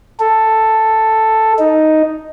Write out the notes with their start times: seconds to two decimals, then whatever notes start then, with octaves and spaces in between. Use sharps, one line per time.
0.20 A4
1.59 D#4